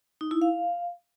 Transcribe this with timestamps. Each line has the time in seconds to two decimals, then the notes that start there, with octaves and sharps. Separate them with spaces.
0.21 D#4
0.31 E4
0.42 F5